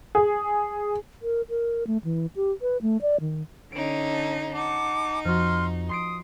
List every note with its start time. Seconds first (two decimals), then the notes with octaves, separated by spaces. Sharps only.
0.15 G#4
1.22 A#4
1.50 A#4
1.87 A3
2.04 E3
2.36 G4
2.62 B4
2.82 A3
3.02 D5
3.21 D#3
3.72 D3 C#4 D#4 D7
4.11 A5
4.53 D#4 F#5 A5 D6
5.25 F2 F3 F#4 C6 F6
5.89 C6 D#6 C7 D7